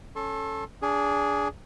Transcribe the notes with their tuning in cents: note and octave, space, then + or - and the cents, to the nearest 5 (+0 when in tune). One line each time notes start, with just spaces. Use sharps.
C#4 +0 A4 +0 C6 +45
D4 -25 G#4 +0